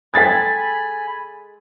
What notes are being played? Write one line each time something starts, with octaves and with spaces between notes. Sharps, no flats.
G#3 A4 G5 G#5 B5 G#6 A6 B6